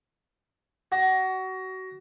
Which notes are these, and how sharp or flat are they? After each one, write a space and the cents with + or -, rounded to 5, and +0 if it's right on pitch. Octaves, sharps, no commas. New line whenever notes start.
F#4 +25